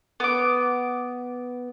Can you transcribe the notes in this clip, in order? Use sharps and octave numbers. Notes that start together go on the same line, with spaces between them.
B3 D6